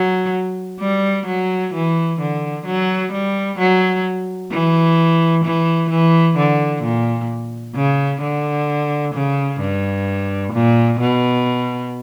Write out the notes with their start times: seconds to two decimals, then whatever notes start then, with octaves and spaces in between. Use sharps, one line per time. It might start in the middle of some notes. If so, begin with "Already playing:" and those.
Already playing: F#3
0.80 G3
1.26 F#3
1.74 E3
2.20 D3
2.65 F#3
3.12 G3
3.58 F#3
4.51 E3
5.44 E3
5.90 E3
6.36 D3
6.82 A#2
7.75 C#3
8.21 D3
9.14 C#3
9.60 G2
10.53 A#2
11.00 B2